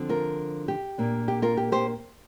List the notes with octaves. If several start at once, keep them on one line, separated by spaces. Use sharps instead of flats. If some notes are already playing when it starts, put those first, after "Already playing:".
Already playing: D3 F3 C4
F4 A#4
G4
A#2 A#3 D4
G4
F4 A#4
G4
G4 C5